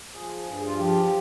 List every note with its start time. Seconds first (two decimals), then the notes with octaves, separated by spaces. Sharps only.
0.14 F3 G#4
0.46 G2
0.67 F4
0.78 F3 G4